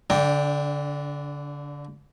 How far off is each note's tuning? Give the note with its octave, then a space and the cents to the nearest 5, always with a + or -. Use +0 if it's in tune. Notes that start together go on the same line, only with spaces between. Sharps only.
D3 -30 D4 +0 G5 +0